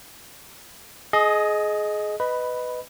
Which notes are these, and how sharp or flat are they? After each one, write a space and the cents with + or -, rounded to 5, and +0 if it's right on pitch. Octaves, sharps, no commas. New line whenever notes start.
G#4 +25 D#5 +0
B4 +15 D#5 +0 B5 +0